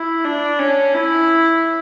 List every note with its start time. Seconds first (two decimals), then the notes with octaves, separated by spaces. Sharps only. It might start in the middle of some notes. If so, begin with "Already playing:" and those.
Already playing: E4
0.24 D4
0.59 C#4
0.94 E4